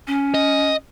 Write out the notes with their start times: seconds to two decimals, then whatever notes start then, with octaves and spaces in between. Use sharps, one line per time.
0.07 C#4
0.34 D#5